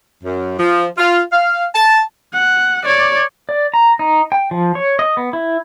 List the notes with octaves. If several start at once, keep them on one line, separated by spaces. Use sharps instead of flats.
F#2
F3
F4
F5
A5
F#5
C#5 D5
D5
A#5
D#4
G5
F3
C#5
D#5
B3
E4